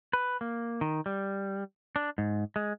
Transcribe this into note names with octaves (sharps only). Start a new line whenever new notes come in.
B4
A#3
D#3
G3
D4
G#2
G#3